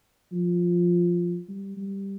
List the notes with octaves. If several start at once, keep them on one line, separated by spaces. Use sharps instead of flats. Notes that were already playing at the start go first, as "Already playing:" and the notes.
F3
G3
G3